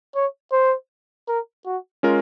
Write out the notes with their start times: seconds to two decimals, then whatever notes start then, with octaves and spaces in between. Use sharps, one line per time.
0.15 C#5
0.52 C5
1.28 A#4
1.66 F#4
2.03 G#3 C#4 F4 A#4